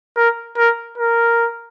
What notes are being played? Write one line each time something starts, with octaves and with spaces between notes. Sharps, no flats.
A#4
A#4
A#4